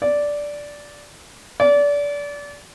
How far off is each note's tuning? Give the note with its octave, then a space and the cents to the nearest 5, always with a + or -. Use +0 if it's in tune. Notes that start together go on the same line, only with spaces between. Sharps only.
D5 -5
D5 -25